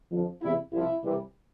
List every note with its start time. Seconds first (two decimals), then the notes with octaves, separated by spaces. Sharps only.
0.12 F2 D3 F3
0.41 E2 C3 E3 G3 E4
0.73 C2 C3 F3 E4
1.04 C2 C3 E3 G3